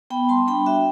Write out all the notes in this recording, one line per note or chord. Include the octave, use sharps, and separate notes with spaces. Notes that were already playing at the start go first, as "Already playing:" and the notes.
B3 G5 B5
G3 A5 C6
D4 G5 B5
F#4 E5 G5